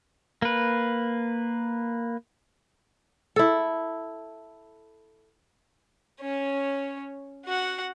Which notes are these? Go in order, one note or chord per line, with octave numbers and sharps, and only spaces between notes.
A#3 B4
E4 A4
C#4 C#5
F#4 F#5